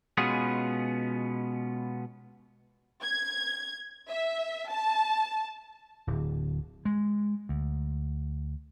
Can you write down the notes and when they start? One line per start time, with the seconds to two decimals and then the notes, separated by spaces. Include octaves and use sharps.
0.17 B2 G#3 B3 C#4 F4 G#4
3.03 G#6
4.10 E5
4.70 A5
6.07 D1
6.85 G#3
7.49 D2